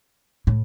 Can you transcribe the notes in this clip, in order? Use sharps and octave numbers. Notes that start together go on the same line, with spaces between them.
A2